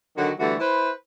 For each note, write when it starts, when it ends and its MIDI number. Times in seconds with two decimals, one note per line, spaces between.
0.17 0.30 50
0.17 0.30 51
0.17 0.30 54
0.17 0.30 66
0.39 0.54 50
0.39 0.54 52
0.39 0.54 55
0.39 0.54 57
0.39 0.54 66
0.60 0.90 64
0.60 0.90 71
0.60 0.90 72